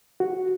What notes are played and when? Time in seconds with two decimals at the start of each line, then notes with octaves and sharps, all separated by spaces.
0.20 F#4